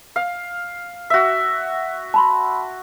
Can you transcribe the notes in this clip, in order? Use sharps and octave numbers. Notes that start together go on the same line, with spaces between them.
F5
F#4 E5
A5 B5 C6